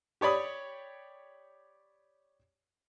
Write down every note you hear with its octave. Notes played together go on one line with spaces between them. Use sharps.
G4 C#5 D5 B5 D#6